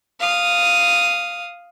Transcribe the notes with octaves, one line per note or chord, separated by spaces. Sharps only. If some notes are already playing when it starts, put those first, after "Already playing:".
F5 D#6